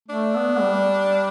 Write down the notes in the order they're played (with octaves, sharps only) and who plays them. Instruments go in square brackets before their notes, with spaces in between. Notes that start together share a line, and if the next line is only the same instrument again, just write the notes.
[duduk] A3 [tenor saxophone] D4
[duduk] B3
G3